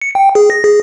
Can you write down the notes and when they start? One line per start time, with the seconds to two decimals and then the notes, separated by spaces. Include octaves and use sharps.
0.02 C#7
0.15 G5
0.35 G#4
0.50 A#6
0.64 G#4